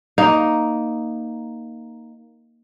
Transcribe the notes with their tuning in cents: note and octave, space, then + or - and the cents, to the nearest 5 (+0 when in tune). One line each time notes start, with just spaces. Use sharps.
A#3 +0 D#4 +0